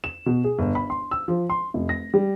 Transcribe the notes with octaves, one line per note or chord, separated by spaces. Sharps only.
E7
B2
G#4
G1
B5
C6
E6
F3
C6
F1
A#6
G3